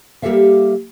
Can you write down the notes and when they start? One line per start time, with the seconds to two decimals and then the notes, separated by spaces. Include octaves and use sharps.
0.22 G3 A#3 G4 A4 E5 F5